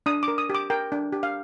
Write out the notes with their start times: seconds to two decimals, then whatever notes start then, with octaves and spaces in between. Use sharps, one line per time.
0.06 D4 D#6
0.23 D6
0.28 A#4
0.38 D#6
0.50 G4
0.55 D6
0.70 A#4 G5
0.92 D4
1.12 G4
1.23 F5